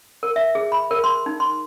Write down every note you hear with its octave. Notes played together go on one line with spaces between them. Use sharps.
A#4
E5
G#4
B5
A#4
C6
D#4
C6